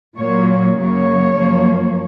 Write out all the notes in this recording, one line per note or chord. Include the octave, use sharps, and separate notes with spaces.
A#2 F#3 A#3 C#5
F#2 C#3 F#3 A#3 C#5
F#2 F3 A#3